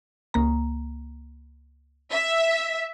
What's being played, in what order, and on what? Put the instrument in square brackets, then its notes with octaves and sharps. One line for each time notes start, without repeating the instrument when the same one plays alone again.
[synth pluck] C#2 A#3 A#5
[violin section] E5